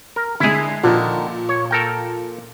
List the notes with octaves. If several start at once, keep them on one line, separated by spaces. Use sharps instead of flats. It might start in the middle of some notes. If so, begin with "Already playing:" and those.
A#4
D3 G#3 E4 G#4
A#2 D3 D#3 F3
C#5
A4 A#4 G5